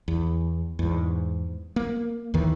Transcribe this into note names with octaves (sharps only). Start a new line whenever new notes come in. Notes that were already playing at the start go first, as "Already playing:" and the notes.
E2
E2 G#2
A#3
D#2 D#3 E3